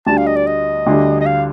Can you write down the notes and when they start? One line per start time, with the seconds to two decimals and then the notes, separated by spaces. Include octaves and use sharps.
0.07 D2 D3 G3 D4 A5
0.17 F5
0.26 D#5
0.36 D5
0.47 D#5
0.87 D2 D3 G3
1.21 D#5
1.26 F5